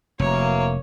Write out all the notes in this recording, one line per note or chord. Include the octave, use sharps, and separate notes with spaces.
F1 E3 F#3 A#3 C#5